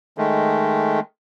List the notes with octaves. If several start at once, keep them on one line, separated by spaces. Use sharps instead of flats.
D#3 G#3 A3